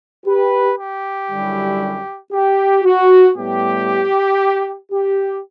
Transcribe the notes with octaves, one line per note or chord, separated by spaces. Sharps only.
G4 B4
G4
F#2 D3 G3 C#4 E4
G4
F#4
A2 G3 B3 G4
G4